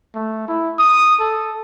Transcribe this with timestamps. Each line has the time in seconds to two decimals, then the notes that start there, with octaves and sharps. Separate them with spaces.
0.14 A3
0.48 E4
0.79 D#6
1.20 A4